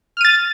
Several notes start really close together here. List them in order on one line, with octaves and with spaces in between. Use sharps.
F6 D#7 A6